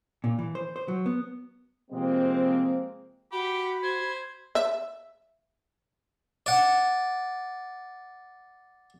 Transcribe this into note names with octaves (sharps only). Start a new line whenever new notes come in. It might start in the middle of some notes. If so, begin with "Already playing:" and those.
A#2
E3
C5
C5
F#3
B3
C3 F3 G#3 A#3 C4
F#4 G4 F#5 B5
C5 G#6
E5
D5 F#5